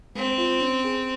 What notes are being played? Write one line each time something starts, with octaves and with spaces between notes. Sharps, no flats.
G#3 C4
F4
C#4
G#4